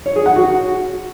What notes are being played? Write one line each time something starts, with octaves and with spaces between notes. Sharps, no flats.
C#5
G#4
F#5
F#4